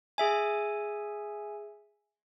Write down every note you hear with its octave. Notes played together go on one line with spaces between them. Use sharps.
G#4 E5 G#5